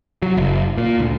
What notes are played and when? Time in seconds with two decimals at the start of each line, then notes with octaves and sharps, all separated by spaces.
0.22 F#3
0.37 F#1
0.78 A#2
0.99 D2